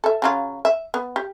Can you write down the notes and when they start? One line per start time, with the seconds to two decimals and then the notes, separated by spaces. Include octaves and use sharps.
0.04 A4 E5
0.22 C#3 F#3 F4
0.65 E5
0.94 B3
1.16 G4